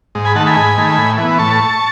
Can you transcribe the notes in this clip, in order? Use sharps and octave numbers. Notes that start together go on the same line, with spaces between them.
G#2
G#5 B5
D#3 A3 F#5 A5
G#5 B5
G#2
D#3 A3
A2
E3 B3
A2 A5 C#6